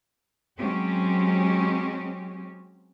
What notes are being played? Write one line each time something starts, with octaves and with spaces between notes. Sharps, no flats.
F#3 G#3 C4 C#4 G4